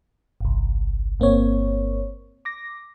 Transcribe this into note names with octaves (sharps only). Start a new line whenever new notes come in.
G1 C2
G1 A#3 C4 C#5
D6 A#6